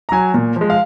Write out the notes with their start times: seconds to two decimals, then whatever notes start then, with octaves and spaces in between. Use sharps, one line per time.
0.09 A#5
0.12 F#3 G#5
0.34 A#2
0.56 F3 G#3
0.70 F5